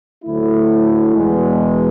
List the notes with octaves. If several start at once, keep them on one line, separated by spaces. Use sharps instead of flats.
D2 D3 F#3 A3 E4
E2 B2 G#3